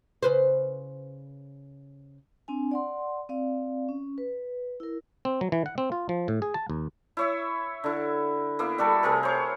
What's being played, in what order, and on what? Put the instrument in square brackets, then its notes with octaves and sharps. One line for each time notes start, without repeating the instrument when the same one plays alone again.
[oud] C#3 B4 C5
[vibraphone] C4 D4 G#5
D5 F#5 C6
C4 D5 F5
C#4
B4
E4 A#4
[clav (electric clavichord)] C4
F#3
E3
F#5
C4
F4
F3
A2
G#4
A5
D#2
[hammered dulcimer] E4 C#5 E5
D3 E4
A#3 B3 E4
G3 F#4 A4 A#4
C3 A3 G#4 A#4
C5 C#5